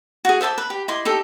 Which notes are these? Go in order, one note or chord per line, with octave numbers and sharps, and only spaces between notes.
F#4 G#4
C5 E5 A5 D6
B4
G4
E4 D#5 C6 D6
D#4 G4 A4